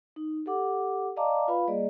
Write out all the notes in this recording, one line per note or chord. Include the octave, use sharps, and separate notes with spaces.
D#4
G4 A4 F#5 D6
D5 D#5 F5 A5 A#5 D6
F4 B4 F5 B5
G3 A#3 G#4 D5 D#5